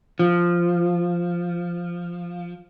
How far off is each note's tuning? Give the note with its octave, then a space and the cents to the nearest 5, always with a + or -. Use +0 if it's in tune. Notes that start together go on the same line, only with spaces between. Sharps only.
F3 -5